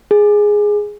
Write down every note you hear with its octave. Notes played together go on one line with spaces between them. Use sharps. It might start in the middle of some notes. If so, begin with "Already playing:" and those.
G#4